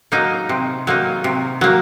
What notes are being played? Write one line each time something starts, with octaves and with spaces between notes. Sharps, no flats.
F#3 A#3 D#4
C3
F#3 A#3 D#4
C3
F#3 A#3